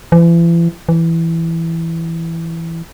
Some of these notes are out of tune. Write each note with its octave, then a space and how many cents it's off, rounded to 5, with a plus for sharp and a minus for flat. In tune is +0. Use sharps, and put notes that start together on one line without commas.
E3 +40
E3 +5